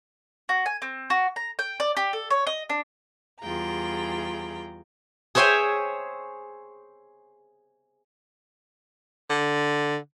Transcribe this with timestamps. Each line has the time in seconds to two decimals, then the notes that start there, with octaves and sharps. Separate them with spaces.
0.49 F#4
0.66 G#5
0.82 C4
1.10 F#4
1.36 A#5
1.59 G5
1.80 D5
1.97 G4
2.13 A4
2.30 C#5
2.47 D#5
2.69 D4
3.41 E2 G3 F4 G#4 G5 A#5
5.35 G#4 C5 C#5 E5 G5 G#5
9.30 D3